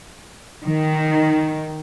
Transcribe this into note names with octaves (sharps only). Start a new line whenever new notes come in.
D#3